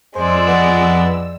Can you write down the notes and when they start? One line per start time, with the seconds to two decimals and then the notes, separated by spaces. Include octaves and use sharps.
0.15 F2 G#3 C5 D5 E6
0.47 B3